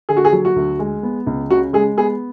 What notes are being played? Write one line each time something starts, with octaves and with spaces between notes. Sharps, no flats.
D3 G#4
F#4
G#4
F#3
F#4
D2
G#3
B3
C#2
C#3 F#4
G#3 G#4
B3 G#4